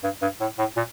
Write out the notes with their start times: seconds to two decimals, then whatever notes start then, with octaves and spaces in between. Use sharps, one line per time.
0.04 G2
0.22 G2
0.40 A2
0.58 A2
0.77 A#2